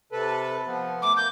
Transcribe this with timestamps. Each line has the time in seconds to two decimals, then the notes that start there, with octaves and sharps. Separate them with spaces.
0.12 C3 A4 B4
0.67 F3 B3
1.02 A3 D6
1.17 A#3 G6